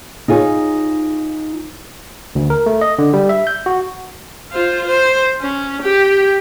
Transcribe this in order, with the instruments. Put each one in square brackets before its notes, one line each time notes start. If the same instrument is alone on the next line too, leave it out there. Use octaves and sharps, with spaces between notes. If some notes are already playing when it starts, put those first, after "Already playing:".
[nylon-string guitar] D#4 F4 G#4 C#5
[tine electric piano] D2
A#4
A3
D#5
D3
G3
E5
G6
F#4
[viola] F4 C5
C5
C#4
G4 G5